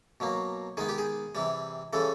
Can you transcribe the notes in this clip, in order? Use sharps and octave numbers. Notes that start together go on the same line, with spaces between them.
B2 F#3 A#3
D#3 G#3 B3 G#4
G4
G#4
C3 E3 G3
C#3 E3 G3 A4